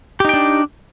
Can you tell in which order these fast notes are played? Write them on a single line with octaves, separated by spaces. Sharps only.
G4 D#4 G5 D4